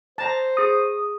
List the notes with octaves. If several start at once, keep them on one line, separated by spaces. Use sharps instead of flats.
C5 A5 A#5
G#4 D#6 A#6